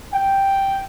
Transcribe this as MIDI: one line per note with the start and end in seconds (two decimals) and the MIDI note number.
0.13 0.82 79